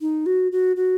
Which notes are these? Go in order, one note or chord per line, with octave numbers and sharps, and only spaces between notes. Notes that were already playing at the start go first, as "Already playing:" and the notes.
D#4
F#4
F#4
F#4